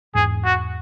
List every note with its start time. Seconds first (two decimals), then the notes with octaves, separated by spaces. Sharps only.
0.15 E2 G#2 G#4
0.44 F#4